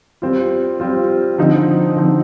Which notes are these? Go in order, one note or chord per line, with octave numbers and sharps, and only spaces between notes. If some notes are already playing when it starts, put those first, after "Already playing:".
G3 C4 F4
G3 C4 F4
D3 F3 C4 D#4
D3 F3 C4 D#4